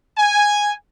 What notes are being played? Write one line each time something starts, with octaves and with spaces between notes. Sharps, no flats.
G#5